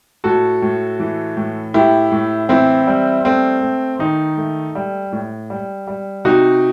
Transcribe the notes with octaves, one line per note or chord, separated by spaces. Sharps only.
A2 F#4 A4
A2
E3
A2
A2 E4 G4
A2
E3 C4 E4
G3
A3 C4
A3
D#3 D#4
A3
G3
A2
G3
G3
C3 D#4 F#4